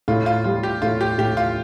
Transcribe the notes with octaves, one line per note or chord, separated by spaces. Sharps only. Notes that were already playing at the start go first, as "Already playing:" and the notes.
A2 F4
F4
G3 F4
G4
A2 F4
G4
A2 G4
F4